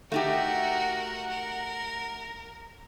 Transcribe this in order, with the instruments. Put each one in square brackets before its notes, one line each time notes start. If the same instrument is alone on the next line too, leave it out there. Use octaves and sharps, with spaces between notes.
[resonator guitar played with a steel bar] A3 D#4 G4 [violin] F#4 A#4 [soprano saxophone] F#5
[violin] A#4